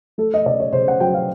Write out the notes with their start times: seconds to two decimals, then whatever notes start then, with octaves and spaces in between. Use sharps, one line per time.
0.18 A3 A4
0.34 D#5
0.46 C#3 D5
0.60 C#5
0.72 C#3 C5
0.88 F#5
1.00 F#3 G5
1.14 F5